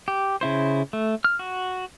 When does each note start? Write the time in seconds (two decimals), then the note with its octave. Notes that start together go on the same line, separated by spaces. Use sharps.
0.08 G4
0.41 C#3 E4 C5
0.93 A3
1.24 F6
1.39 F#4